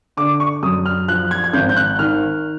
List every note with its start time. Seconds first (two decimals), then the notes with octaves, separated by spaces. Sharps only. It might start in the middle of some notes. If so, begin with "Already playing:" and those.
0.17 D3 D6
0.40 C#6
0.63 F#2 D#6
0.86 F6
1.08 F3 F#6
1.31 G#6
1.44 G#6
1.53 G#1 G6
1.69 G6
1.77 F#6
1.99 D#3 F6